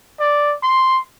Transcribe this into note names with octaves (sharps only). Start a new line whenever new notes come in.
D5
C6